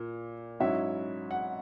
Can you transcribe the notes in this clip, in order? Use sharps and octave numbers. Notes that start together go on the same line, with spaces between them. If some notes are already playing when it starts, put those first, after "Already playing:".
Already playing: A#2 A#3
G#2 F#3 C#4 E4 E5
F#5